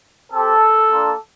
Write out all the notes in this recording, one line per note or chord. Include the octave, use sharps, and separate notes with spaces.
C4 G4 A4
A#3 D4 F4